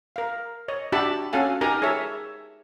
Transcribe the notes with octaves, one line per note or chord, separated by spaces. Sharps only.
A#4 F5
C#5 D#5
D4 F#4 G4 E5 A5 B5
C#4 F#4 A4 F5 G#5
D#4 G4 A#4 G#5 A#5
G#4 A4 C#5 E5